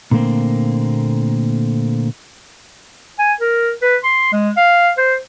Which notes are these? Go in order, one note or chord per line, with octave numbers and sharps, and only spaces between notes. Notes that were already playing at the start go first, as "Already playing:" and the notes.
A#2 D3 A3 A#3 C4
G#5
A#4
B4
C6
G#3
F5
C5